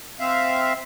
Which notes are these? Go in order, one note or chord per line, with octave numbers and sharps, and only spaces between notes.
C4 E5 F5